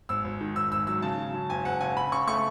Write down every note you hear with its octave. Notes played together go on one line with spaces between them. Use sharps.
G#1 E6
G#1
D#3
G#1 E6
G#1 E6
F#3 E6
C#3 A5
F#3
C#3
F#1 G#5
F#1 F#5
C#3 G#5
C#3 B5
C#3 C#6
A3 C#6